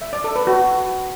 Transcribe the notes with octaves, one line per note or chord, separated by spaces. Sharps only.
E5
D5
A4
B4
F#4